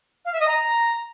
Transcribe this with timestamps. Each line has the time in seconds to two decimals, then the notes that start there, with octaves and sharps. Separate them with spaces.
0.25 F5
0.32 E5
0.40 D#5
0.47 A#5